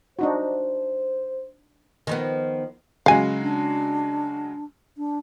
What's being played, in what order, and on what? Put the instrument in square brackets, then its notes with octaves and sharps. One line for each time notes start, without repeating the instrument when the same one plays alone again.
[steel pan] D4 D#4 F#4 [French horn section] C5
[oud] D#3 F3 B3
[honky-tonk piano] C#3 F#3 G#3 [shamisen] F5 G#5
[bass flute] D4
D4